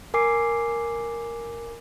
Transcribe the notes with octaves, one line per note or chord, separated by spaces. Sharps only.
A#4 G#5 D6 C7